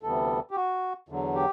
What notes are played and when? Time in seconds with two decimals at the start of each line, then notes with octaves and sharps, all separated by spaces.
0.03 D2 C3 E3 G3 B3 A4
0.51 G4
0.56 F#4
1.09 E2 D3 F#3
1.35 G4